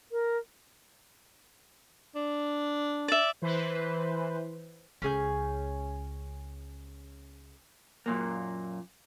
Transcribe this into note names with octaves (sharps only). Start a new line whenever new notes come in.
A#4
D4
D5 E5
E3 B4 C5
C#2 C#4 G#4 G6
F#2 A#2 A#3